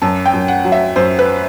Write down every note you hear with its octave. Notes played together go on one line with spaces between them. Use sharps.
F#2 A5
G5
F#2
F#5
F#3
E5
F#2 C5
B4